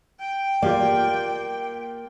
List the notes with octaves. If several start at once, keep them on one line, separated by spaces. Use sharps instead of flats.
G5
A#3 F4 G4 D5